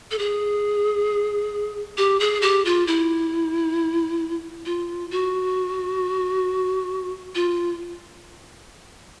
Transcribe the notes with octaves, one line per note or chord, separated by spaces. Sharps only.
A4
G#4
G4
G#4
G4
F4
E4
F4
F#4
F4